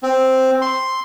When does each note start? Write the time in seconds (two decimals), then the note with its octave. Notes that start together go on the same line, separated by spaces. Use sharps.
0.03 C4
0.62 C6